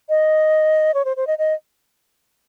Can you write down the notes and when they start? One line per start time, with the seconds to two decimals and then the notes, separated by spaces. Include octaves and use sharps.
0.09 D#5
0.94 C#5
1.05 C5
1.17 C5
1.27 D#5
1.38 D#5